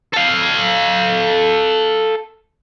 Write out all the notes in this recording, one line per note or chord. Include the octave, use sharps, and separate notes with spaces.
A4 F5